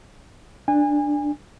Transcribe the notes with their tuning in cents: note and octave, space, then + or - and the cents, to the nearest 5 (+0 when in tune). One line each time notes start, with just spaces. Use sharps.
D4 +5 G#5 -30